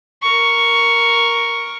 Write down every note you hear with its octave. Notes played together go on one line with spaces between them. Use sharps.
A#4 C#6